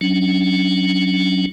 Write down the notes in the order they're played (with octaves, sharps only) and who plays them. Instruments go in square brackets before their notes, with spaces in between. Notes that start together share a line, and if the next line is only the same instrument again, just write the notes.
[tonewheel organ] F#3 C#4 D4